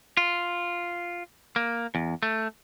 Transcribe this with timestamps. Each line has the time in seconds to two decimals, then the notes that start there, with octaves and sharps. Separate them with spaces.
0.17 F4
1.56 A#3
1.95 E2
2.23 A3